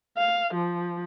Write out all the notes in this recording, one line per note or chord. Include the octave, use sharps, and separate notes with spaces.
F5
F3